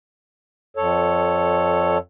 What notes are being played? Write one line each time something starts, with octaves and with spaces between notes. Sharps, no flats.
F2 A4 C#5